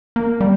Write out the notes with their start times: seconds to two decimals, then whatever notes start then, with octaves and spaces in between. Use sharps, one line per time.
0.16 A#3
0.41 G3